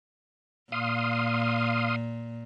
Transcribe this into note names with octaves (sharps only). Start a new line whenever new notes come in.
A#2 F5 C6 D#6